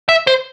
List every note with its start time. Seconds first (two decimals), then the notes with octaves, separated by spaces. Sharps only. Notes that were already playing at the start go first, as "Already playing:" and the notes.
0.09 E5
0.27 C5